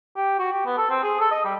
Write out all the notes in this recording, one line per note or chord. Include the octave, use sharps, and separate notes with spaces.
G4
F#4
G4
B3
A4
C4
G#4
A4
D#5
G3